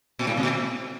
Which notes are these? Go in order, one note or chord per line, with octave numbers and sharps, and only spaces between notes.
A#2
G#2
B2
A#2